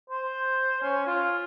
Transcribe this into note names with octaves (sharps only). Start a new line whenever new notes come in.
C5
C#4
F4